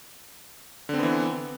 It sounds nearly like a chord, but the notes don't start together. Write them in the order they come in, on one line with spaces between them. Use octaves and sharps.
D3 C4 B3 E3